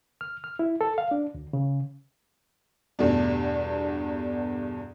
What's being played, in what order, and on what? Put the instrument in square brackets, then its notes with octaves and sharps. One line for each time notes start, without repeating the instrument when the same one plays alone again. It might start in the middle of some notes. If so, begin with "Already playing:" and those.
[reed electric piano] F6
F6
E4
A4
F5
D4
D2
C#3
[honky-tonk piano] E2 G2 B2 A3 D4